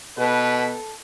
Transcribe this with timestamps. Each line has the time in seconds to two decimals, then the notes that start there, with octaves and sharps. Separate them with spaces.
0.18 B2 A4 B4